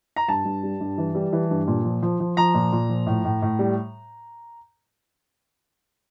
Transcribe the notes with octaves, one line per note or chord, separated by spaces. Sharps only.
A#5
G2 A5
G2
G3
G2
E3
G3
E3
G2
A#2
F3
F3
F3
F3 A#5
A#2
A#2
F3
A2
A2
A2
G3